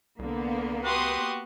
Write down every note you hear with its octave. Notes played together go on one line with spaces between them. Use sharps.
C2 D3 A#3 B3
F#4 G4 B4 C6 D#6